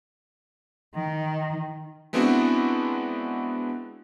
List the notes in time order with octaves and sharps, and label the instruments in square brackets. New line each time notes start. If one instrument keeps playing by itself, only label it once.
[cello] D#3
[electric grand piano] G#3 B3 C4 D4 E4 F#4